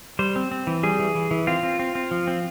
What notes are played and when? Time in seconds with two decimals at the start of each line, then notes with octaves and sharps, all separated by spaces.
0.19 G3 C5
0.36 C4
0.51 C4
0.67 E3
0.83 G3 G#4
0.99 E3
1.15 E3
1.31 E3
1.47 C4 F4
1.63 C4
1.79 C4
1.95 C4
2.11 F3
2.28 C4